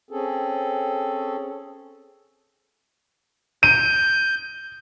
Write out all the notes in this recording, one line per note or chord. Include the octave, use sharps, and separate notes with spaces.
C4 C#4 G#4 A4
G6 D#7